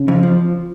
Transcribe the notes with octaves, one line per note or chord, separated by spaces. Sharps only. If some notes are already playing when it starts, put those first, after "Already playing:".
Already playing: C#3
F2
F3